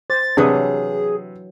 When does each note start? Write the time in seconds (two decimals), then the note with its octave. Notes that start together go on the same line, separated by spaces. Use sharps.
0.10 C5 A6
0.37 C3 E3 F#3 D4 G#4 B4 D#6